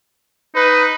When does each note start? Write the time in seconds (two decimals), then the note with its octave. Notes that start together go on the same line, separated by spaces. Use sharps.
0.56 D#4 B4